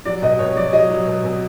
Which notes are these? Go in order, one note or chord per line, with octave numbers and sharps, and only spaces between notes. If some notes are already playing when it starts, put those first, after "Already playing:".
F#3 D5
B2 D#5
B2 C#5
F#3 D5
F#3 D#5
F#3
B2
B2